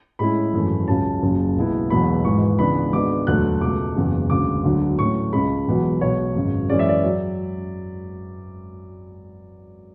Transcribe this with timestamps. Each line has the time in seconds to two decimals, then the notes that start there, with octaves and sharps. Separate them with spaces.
0.19 A2 G#3 C#4 E4 B5
0.53 G#1 F#2 E3 A3
0.88 C#2 C#3 F#3 C#4 A5
1.22 F#1 F#2 C#3
1.56 B1 B2 G#3 B3 E4
1.90 E1 E2 B2 F#3 B5
2.24 G#1 G#2 E3 G#3 C#6
2.59 C#2 C#3 E3 B3 D4 B5
2.93 G#1 G#2 G#3 B3 D4 D6
3.27 E1 D2 D3 F#3 A3 F#6
3.61 C#2 B2 A3 D6
3.96 F#1 E2 C#3
4.30 E1 D2 C#3 D6
4.64 D2 D3 F#3
4.98 A2 F#3 A3 C#4 C#6
5.32 C#2 C#3 G#3 B5
5.67 E1 E2 B2 F#3
6.01 B1 B2 F#3 C#5
6.35 G#1 F#2 C#3
6.69 F#2 E3 G#3 C#4 D5
6.79 E5
6.89 D5
7.03 F#3